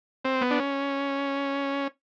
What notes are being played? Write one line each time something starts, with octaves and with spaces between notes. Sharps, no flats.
C4
B3
D4
C#4